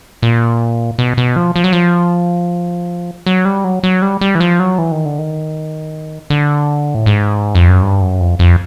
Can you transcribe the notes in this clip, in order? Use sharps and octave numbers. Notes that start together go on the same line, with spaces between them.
A#2
B2
B2
F3
F3
F#3
F3
F#3
G3
F#3
F#3
G3
G3
E3
F3
F#3
E3
D#3
D3
D#3
D3
A2
G#2
F2
F#2
G2
F#2
F2
F2